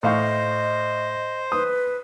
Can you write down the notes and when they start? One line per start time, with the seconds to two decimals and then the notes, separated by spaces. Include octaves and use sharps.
0.03 A2 C5 D#5 F5 C#6
1.52 B4 D#6